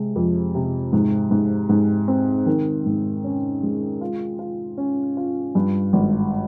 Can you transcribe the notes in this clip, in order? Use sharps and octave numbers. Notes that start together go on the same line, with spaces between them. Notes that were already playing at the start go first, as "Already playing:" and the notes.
Already playing: C3 G#3
F2
C3
G#2
G#2
G#2
C4
D#3
G#2
C#4
G#3
F4
F4
C#4
F4
G2
G#1